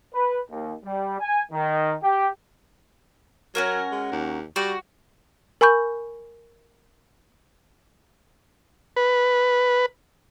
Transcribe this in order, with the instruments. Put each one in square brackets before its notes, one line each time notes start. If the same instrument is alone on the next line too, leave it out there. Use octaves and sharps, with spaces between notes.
[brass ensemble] B4
D#2
G3
G#5
D#3
G4
[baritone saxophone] F#3 [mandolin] C#4 F#4 A#4
[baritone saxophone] G#3
D#2
[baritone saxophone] G3 [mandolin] F#4
[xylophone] A#4 G#5 B5 C#6 G6
[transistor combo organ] B4